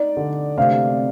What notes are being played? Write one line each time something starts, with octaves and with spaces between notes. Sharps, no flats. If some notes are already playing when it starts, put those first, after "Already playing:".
Already playing: D#4 D5
D3
C3 F5